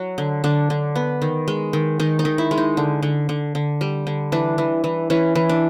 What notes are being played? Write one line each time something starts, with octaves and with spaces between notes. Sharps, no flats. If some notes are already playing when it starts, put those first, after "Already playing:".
Already playing: F#3 F#4
D3
D3 D4
D3
B3
D#3
G#3
D#3
D#3 D#4
D#4
D#3
E4
G#3
D#4
D3
D3
D3
D3
G3
D3
E3 D4
E3
E3
E3 C#4
E3
D4